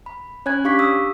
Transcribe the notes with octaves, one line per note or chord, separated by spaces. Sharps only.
B5
C#4 C#5 G#5 B5 F#6 G#6
D4 G4 F5 C#6 D6 B6
D#6 E6